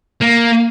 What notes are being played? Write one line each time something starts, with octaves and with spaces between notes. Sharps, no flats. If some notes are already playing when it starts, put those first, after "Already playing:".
A#3